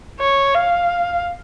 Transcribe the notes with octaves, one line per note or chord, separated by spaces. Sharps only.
C#5
F5